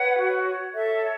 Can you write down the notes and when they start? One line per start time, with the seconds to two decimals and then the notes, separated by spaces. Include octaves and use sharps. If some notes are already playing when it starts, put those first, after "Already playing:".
Already playing: B4 C#5 F#5
0.20 F#4
0.47 C#5
0.74 A4 E5
1.01 C#5